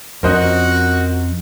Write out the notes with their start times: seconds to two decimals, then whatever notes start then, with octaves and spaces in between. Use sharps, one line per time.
0.23 F2 C#4 D4 F#4 A#4 C5 D#5